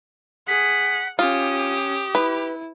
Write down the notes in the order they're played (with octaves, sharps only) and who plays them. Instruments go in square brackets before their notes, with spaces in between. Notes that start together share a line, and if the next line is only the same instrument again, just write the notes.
[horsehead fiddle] G#4 [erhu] F#5 [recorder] B6
[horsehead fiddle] C#4 [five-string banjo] F4 [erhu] G4 [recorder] D#6
[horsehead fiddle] E4 [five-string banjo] B4